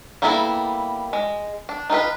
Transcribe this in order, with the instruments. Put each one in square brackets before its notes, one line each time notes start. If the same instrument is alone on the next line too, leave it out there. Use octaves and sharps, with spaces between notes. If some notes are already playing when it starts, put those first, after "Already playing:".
[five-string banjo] G3 A#3 B3 E4 A4
G#3
D4
D#4 F4 A4 B4